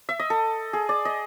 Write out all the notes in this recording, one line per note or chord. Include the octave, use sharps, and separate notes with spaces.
E5
D#5
A4
G#4
D5
D#5